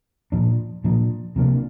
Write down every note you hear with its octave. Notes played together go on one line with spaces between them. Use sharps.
A#2 F3 D4
A#2 F3 D4
C3 F3 A#3 D4